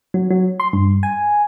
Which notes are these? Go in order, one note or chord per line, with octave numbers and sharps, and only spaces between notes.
F#3
F#3
C6
G2
G#5